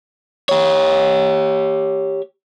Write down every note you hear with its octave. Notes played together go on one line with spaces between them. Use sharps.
G4 C#5